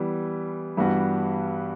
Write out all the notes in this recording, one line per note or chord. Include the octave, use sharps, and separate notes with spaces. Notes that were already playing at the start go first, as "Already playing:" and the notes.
Already playing: E3 G3 B3
G2 E3 G3 B3 F#4